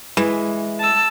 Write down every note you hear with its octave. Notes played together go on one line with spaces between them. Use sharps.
E3 G#3
A5 E6